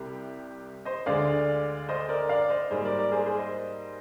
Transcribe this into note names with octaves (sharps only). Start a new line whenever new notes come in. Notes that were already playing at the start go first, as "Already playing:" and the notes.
Already playing: C2 C3 G3 G4
C5 D#5
D2 D3 G#3 D5 F5
C5 D#5
A#4 D5
D5 F5
C5 D#5
G#2 G3 A#3 G#4 C5
A#4 D5
A#4 D5
G#4 C5
G#4 C5
C5 D#5